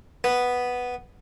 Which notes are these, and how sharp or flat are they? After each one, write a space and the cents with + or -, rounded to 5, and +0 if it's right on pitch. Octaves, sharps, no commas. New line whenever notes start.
B3 +0